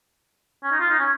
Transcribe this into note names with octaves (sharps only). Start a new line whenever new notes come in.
C#4
D#4
F4
D#4
C#4